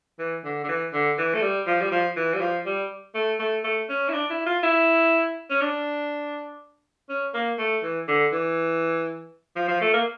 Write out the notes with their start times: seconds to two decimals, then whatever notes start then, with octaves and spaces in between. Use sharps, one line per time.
0.19 E3
0.44 D3
0.64 D3
0.69 E3
0.93 D3
1.18 E3
1.34 A3
1.43 G3
1.67 F3
1.81 G3
1.92 F3
2.17 E3
2.34 G3
2.41 F3
2.66 G3
3.15 A3
3.40 A3
3.64 A3
3.89 C#4
4.09 E4
4.13 D4
4.30 E4
4.47 F4
4.63 E4
5.50 C#4
5.61 D4
7.09 C#4
7.34 A#3
7.58 A3
7.83 E3
8.08 D3
8.32 E3
9.56 F3
9.68 F3
9.81 A3
9.93 A#3